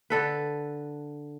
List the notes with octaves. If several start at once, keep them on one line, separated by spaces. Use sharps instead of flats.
D3 A4 B4